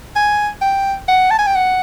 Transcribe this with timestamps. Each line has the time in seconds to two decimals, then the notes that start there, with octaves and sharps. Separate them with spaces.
0.16 G#5
0.62 G5
1.08 F#5
1.31 A5
1.39 G#5
1.47 G5
1.55 F#5